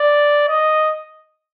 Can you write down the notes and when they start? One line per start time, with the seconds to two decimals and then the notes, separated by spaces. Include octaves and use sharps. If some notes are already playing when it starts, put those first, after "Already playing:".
Already playing: D5
0.48 D#5